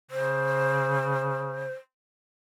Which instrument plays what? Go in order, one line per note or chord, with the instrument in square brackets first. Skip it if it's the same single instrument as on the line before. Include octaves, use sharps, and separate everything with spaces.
[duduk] C#3 [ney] C5